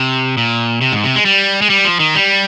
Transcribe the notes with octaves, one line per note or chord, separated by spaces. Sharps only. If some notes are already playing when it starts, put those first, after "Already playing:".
Already playing: C3
A#2
C3
G#2
C3
G#3
G3
G#3
G3
F3
D#3
G3